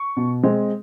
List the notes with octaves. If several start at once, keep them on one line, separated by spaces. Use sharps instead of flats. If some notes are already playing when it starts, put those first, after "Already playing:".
Already playing: C#6
B2
G#3 C4